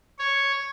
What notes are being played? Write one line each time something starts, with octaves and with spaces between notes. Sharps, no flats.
C#5